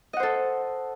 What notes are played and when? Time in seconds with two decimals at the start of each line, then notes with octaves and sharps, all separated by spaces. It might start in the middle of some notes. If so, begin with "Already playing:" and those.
0.13 D#5
0.17 F#5
0.20 C5
0.23 A4